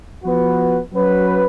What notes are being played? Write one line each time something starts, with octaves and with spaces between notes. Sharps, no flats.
F3 B3 F#4 B4
F#3 C#4 F#4 B4